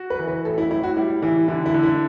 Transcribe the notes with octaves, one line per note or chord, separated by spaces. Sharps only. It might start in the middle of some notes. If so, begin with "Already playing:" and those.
Already playing: F#4
B4
E3
B4
A2 A4
E4
A2 E4
F#4
G3 E4
E3 E4
D3 E4
E4
D3
E4